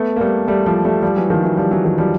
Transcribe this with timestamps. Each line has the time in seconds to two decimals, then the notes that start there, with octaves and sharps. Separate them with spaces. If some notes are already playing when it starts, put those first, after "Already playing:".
Already playing: A3 B3
0.16 A#3
0.20 G3 A3
0.48 G3 A3
0.66 F3 G3
0.85 G3 A3
1.02 F3 G3
1.16 E3 F#3
1.30 D#3 F3
1.43 E3 F#3
1.57 F3 G3
1.71 E3 F#3
1.84 D#3 F3
1.98 F3 G3